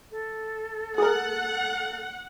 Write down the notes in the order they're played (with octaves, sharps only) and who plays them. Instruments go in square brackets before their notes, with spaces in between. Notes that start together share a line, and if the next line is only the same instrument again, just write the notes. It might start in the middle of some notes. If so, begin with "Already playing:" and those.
[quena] A4
[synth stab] G#4 A#4 [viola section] F#5